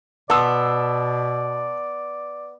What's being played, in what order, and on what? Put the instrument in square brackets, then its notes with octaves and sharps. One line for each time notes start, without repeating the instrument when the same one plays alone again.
[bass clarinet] B2 [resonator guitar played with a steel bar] B3 [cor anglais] D5 [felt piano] A5 C6 E6